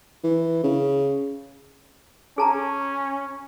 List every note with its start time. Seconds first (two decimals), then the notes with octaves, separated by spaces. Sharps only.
0.24 E3
0.63 C#3
2.38 C#4 G#4 A5 A#5